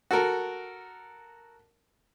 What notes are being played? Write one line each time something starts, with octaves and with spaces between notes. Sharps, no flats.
F#4 A4 A#4